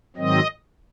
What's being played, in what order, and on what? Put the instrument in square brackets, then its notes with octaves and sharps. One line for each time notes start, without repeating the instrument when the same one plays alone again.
[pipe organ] G#2 D#3 F#3 C4 D#5